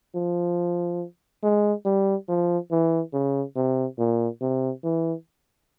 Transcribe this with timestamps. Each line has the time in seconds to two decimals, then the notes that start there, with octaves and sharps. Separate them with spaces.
0.15 F3
1.43 G#3
1.85 G3
2.28 F3
2.71 E3
3.13 C#3
3.56 C3
3.98 A#2
4.41 C3
4.83 E3